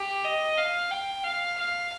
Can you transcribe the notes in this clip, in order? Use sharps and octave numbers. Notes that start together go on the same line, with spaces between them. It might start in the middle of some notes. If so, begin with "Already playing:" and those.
Already playing: G4
D#5
F5
G5
F5
F5